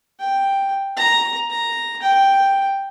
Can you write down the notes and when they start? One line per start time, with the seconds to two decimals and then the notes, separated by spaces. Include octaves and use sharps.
0.19 G5
0.97 A#5
1.50 A#5
2.02 G5